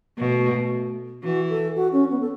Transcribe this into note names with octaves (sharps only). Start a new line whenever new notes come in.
B2 A3
E3 F#4
A4
F#4
C#4
B3
A4